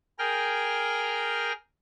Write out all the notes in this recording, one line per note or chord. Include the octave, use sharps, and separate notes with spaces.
G#4 A#4 G5 F6